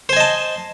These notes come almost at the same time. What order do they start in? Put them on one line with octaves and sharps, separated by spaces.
C5 G#5 D#5 A5